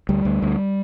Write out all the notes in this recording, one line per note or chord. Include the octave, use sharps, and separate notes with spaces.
D2 G3
D2
D2